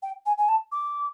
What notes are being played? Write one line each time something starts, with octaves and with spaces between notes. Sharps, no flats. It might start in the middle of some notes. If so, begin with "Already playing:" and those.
G5
G#5
G#5
A5
D6